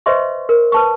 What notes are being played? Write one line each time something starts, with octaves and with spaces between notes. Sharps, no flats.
B4 C5 D#5 E5 C6 C#6
A#4
B4 A5 C#6